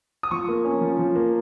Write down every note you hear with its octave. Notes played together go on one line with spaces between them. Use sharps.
D#6
F3 C#6
A#3
C#4
F3
F3
A#3